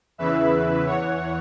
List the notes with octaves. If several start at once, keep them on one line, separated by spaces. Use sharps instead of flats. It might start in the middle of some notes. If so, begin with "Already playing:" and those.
E2 C#3 E3 B4 E5
E2 E3 C#5 F#5